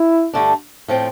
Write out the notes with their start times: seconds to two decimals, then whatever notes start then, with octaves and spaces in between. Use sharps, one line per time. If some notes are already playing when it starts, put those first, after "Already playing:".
Already playing: E4
0.34 G2 D3 A3 D4
0.88 A2 F3 C4